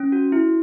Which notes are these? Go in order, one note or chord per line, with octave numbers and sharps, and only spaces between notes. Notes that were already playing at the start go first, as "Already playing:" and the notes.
Already playing: C#4
F#4
E4